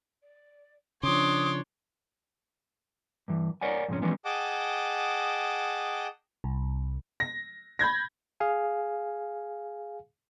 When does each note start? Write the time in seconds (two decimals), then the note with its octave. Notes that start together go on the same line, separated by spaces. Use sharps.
0.22 D5
1.03 C#3 F3 D4 C#5 C6 D6 D#6
3.28 G2 E3
3.61 A#4 C#5 D5 F#5 G#5
3.88 F2 G#2 C3 G#3 C#4
4.02 E3 F3 G3 G#3 B3 C#4
4.25 G#4 D#5 F#5 G5 A5 D6
6.44 C2
7.20 A#6
7.79 B5 G6 G#6 A#6
8.40 G#4 F5 G#5